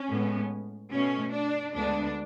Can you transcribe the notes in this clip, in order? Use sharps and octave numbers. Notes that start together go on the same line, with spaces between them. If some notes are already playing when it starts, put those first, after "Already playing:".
Already playing: C#4
A2 G#3 B3
B2 A3 C#4
D4
D2 D3 G#3 B3 D4